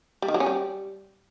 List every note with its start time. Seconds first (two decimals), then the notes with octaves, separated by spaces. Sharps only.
0.22 G3
0.28 D#3
0.34 F#3
0.40 C#4
0.46 G3